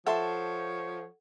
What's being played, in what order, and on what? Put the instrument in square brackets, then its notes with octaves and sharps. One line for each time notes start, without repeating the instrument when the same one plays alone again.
[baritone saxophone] F3 [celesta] A4 F#5 [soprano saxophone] C#5 [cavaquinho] E5 A5 C6